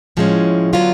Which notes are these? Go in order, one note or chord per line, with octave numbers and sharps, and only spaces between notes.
A2 F3 G#3 C#4
D3 F#3 B3 F4